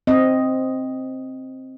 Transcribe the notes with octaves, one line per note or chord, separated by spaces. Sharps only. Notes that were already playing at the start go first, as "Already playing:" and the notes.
C4 D#5